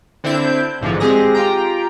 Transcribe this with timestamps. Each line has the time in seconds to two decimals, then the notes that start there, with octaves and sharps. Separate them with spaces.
0.24 D3 C4 D4 E4 G6
0.81 A1 G#2 D3 E3 F3
1.00 G#3 C4 G4 G#4 A#6
1.35 F4 G4 G5 A#5